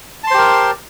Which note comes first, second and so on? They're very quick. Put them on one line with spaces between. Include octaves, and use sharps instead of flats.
A5 C6 C5 G4 A#4